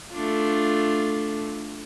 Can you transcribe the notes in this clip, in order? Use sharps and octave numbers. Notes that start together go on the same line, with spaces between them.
A3 D4 F4